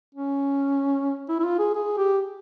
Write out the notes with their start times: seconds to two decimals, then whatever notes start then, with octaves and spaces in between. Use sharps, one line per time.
0.15 C#4
1.29 E4
1.39 E4
1.44 F4
1.59 G#4
1.74 G#4
1.97 G4